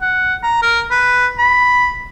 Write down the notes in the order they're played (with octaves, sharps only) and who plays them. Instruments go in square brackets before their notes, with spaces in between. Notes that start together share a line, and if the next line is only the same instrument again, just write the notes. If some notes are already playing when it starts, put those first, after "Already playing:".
[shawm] F#5
A#5
A#4
B4
B5